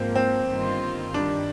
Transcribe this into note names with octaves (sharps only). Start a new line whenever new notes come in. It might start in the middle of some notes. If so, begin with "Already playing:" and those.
Already playing: G#2 F3 A#3 C4
C4
G1 G2 D#3 A#3 F4
G2 D#3 G3 D4